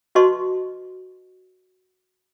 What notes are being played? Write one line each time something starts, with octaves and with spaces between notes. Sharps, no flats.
F#4 B4 D#5 A5 C6 C#6